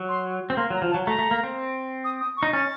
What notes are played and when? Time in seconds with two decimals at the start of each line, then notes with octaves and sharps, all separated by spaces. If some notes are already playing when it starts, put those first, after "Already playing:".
Already playing: F#3
0.09 C6
0.50 C4
0.57 A#3 C6
0.70 F#3 A#5
0.82 F3
0.90 A5
0.94 F#3
1.06 A3 A#5
1.19 A3
1.31 A#3
1.44 C4
2.04 D#6
2.21 D#6
2.37 C#6
2.43 D#4
2.53 C#4 A6